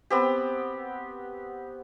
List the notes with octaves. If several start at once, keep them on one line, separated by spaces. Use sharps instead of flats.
B3 C4 G4